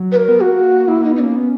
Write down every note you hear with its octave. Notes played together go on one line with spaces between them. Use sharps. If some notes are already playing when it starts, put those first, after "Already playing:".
Already playing: F#3
B4
A#4
B3
A#3 F#4
A#3 E4
A#3 D#4
B3 D#4
A#3 C#4
B3